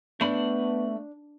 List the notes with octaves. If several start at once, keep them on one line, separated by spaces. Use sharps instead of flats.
A3 B3 D4 B5